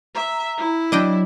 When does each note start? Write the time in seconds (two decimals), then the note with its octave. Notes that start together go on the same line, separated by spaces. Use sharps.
0.15 E5 A#5
0.58 E4
0.92 F#3 D4 D#5 G5